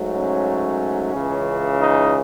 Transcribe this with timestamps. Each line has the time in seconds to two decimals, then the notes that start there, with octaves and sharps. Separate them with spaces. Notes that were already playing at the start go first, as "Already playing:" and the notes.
Already playing: G#2 F#3 A3
0.15 C#4
1.14 C#2 C#3 E3
1.80 D#4